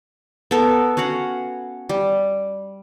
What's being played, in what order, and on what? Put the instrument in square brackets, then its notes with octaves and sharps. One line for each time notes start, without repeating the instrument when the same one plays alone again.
[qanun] B3 A4 A#4
C#4 F#4 F5 F#5
G3